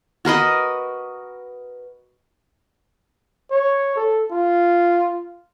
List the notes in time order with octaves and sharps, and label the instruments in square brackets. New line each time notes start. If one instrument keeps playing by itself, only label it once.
[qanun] F#4 A#4 B4 D#5
[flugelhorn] C#5
A4
F4